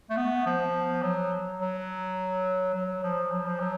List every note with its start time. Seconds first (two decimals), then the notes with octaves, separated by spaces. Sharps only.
0.10 A3
0.17 B3
0.46 F3
1.02 F#3
1.60 F#3
2.74 F#3
3.03 F3
3.32 F#3
3.46 F3
3.60 F#3